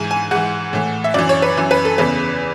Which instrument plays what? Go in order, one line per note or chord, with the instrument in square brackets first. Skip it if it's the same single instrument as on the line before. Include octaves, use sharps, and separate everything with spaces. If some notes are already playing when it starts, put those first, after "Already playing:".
Already playing: [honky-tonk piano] G#2 E3 G#5
G#5
G#2 E3 F#5
A2 E3
E5
F#2 E3 D5
C#5
B4
F#2 E3
B4
A4
E2 C#3 E3 B4